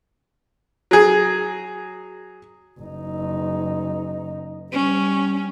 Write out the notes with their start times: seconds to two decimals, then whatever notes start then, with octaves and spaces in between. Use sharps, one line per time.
0.91 F#3 G#4
2.80 F#1 D#4
4.72 G3 C#4